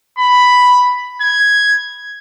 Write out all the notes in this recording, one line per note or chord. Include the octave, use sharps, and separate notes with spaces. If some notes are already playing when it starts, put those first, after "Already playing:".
B5
G#6